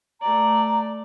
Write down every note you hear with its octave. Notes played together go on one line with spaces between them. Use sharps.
A3 D5 A#5